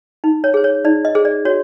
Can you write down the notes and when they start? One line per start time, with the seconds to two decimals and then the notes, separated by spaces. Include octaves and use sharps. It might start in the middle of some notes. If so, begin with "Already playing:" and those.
0.24 D#4
0.44 C#5
0.54 G#4 C5
0.64 C#5
0.84 D#4 D5
1.05 D#5
1.15 G#4 C5
1.25 D5
1.45 F#4 C#5